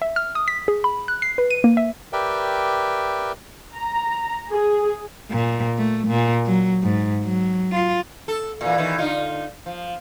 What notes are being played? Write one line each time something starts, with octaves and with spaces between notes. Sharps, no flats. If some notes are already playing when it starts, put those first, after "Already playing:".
E5
F6
D#6
B6
G#4
B5
F#6
C7
B4
D#7
A#3
E5
G4 A#4 B4 D5 E5 G5
A#5
G#4
A#2
A3
A#2
F#3
G#2
F#3
F4
A4
A#2 E3
B2 D#3 E3
D3 D#4 F4
F3